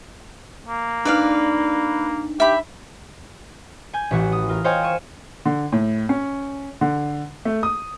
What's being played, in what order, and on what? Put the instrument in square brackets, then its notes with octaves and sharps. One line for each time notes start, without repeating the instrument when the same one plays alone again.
[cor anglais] A#3
[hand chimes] D4 D#4 [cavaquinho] B4 D5 F5
[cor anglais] G4 [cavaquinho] E5 B5
[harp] G#5 G6
A1 E3 F#4
D#6
F4 A#4
C5 C#5 D#5 F5 G5 G#5
C#6 G#6 D#7 E7
[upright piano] D3
A2
C#4
D3
A3
D#6